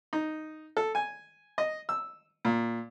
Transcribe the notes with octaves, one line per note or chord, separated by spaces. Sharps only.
D#4
A4
G#5
D#5
E6
A#2